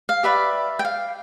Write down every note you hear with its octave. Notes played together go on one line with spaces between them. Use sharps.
F5
G4 B4 D5 E5
G5
F5